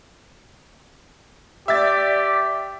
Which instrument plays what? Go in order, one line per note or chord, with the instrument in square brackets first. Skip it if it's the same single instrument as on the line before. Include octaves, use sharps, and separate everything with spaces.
[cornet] G4 [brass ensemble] D5 [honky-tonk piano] E5 A6